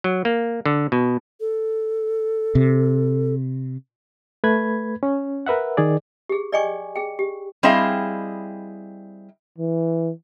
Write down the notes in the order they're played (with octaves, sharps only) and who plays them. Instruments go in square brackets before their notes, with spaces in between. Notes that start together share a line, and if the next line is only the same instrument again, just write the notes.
[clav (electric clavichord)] F#3
A#3
D3
B2
[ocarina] A4
[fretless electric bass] C3
[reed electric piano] A3 B4 B5 G#6
C#4
A#4 B4 E5 F#5
D#3 G#4 D5
[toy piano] G4 G#4
D5 D#5 G5 G#5 C#6 D6
G#4 G5
G4
[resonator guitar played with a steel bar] G3 C4 E4 G#4 D#5 F5
[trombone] E3